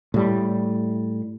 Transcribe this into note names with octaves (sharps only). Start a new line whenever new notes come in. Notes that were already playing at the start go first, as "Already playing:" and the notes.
A2 G3